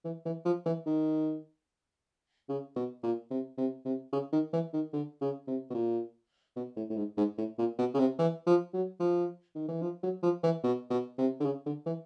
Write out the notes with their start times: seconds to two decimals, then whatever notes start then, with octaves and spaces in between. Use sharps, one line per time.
0.04 E3
0.25 E3
0.45 F3
0.66 E3
0.86 D#3
2.49 C#3
2.76 B2
3.03 A#2
3.31 C3
3.58 C3
3.85 C3
4.12 C#3
4.32 D#3
4.53 E3
4.73 D#3
4.93 D3
5.21 C#3
5.47 C3
5.70 B2
5.74 A#2
6.56 B2
6.76 A2
6.89 A2
6.97 G#2
7.17 G#2
7.38 A2
7.58 A#2
7.78 B2
7.94 C#3
7.99 C3
8.19 E3
8.46 F3
8.73 F#3
9.00 F3
9.55 D#3
9.68 E3
9.82 F3
10.03 F#3
10.23 F3
10.43 E3
10.64 B2
10.90 B2
11.18 C3
11.40 D3
11.45 C#3
11.66 D3
11.86 E3